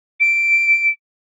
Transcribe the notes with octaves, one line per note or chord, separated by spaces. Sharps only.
D7